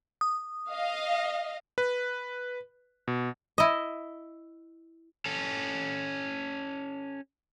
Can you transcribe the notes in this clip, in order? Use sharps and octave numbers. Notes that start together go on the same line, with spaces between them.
D#6
D#5 F5
B4
B2
E4 D#5
C#4 A4